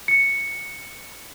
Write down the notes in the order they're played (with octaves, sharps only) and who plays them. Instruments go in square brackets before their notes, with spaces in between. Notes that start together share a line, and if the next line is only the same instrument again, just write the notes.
[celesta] C#7